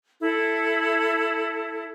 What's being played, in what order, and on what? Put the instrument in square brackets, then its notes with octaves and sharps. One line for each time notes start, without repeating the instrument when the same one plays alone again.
[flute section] E4 A4